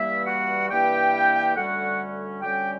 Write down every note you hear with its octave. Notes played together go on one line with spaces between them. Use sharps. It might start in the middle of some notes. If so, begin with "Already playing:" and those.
Already playing: G2 E3 G3 A#3 E4 E5
F#4 F#5
G2 E3 G3 A#3 G4 G5
D2 D3 G3 C#4 F#4 F#5
D2 D3 G3 C#4 G4 G5